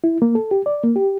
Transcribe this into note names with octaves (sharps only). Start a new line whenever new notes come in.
E4
A#3
A4
G4
D5
A#3
G4